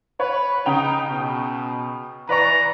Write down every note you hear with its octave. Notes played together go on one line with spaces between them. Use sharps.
B4 C#5
C#3 D#4 G5 F7
B2
E3 B4 D5 A#5 C#6